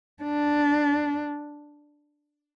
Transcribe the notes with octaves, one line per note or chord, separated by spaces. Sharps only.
D4